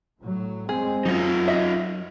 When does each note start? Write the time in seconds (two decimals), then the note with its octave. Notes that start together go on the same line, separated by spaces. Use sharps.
0.20 A2 F#3
0.69 G#3 C4 G#4
1.06 F#2 F#3 D#4 F4
1.48 F#4 D#5 E5